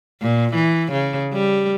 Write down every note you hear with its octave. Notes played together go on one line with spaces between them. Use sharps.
A#2
E3
C#3
G3